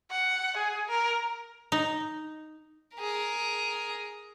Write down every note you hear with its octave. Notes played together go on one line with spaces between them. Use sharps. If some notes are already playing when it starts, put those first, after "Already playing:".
F#5
G#4
A#4
D#4
G#4 A#4